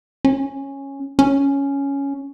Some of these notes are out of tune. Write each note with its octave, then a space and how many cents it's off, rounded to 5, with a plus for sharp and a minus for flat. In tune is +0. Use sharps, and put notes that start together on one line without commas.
C#4 -10
C#4 +5